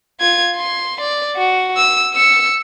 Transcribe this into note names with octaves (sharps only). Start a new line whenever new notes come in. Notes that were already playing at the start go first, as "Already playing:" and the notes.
F4 G#6
C6
D5
F#4
E6
E6 C#7